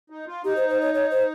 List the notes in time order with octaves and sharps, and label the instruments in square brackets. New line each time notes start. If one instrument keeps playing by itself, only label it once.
[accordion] D#4
F4
[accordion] D#4 [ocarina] G4
[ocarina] C5
C5
C#5
C#5
C5